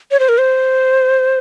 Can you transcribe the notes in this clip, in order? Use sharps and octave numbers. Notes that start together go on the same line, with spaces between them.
C#5
C5
A#4
C5